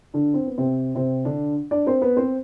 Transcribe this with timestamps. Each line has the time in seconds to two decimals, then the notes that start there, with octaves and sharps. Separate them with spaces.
0.14 D3 D4
0.34 C4
0.46 B3
0.58 C3 C4
0.95 C3 C4
1.25 D3 D4
1.71 D4 D5
1.87 C4 C5
2.02 B3 B4
2.17 C4 C5